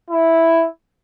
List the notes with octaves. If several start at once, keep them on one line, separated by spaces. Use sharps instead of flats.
E4